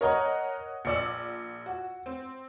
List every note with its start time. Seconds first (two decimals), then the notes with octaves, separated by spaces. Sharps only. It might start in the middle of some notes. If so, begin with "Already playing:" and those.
0.01 A#4 C#5 D#5 F#5 A#5
0.85 A#1 D5 E6 C#7
1.66 F#4
2.06 C4